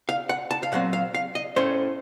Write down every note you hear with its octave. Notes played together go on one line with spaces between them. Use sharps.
F5
F#5
A5
F5
A#2 F#3 C4 F#5
F5
F5
D#5
A2 A3 C#4 C5